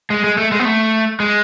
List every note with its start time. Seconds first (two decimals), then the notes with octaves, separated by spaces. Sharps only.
0.10 G#3
0.24 G#3
0.38 A3
0.52 G#3
0.59 B3
0.65 A3
1.20 G#3